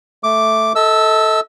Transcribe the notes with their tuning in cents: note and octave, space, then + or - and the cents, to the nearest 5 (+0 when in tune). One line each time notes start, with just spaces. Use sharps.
A3 +0 D6 +0
A4 +0 D#5 +45 E6 +0